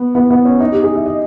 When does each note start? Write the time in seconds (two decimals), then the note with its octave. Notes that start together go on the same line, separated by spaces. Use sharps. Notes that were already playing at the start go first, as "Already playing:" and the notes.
Already playing: B3
0.15 B3
0.30 B3
0.45 C#4
0.60 D#4
0.72 G4
0.83 G#4
0.95 E5
1.06 D#5